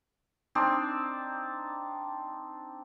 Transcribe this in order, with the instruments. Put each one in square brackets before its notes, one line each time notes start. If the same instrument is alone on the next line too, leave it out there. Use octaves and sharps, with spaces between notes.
[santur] C4 D4 D#4 D5